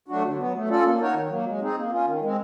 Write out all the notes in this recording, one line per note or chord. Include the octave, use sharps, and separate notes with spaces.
F#3 A3 D4 F#4
D3
B3
F#3
A3
C#4 F4 A4 D5
A#3
D#4 F#4 A#4 C#5
D#3
F#3 A#3
G#3
C4 D#4 G#4
A#3
C#4 F4
D#3
G#3 C4